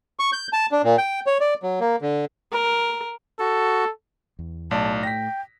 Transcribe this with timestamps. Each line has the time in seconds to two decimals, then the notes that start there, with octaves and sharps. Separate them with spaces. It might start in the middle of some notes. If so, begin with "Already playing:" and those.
0.19 C#6
0.33 G6
0.53 A5
0.72 D4
0.84 A#2
0.98 G5
1.26 C#5
1.40 D5
1.63 F#3
1.80 A#3
2.02 D3
2.52 A#4
3.40 F#4 A4
4.39 E2
4.71 B1 A2 A3 D5 A5
5.03 G5 A#6 B6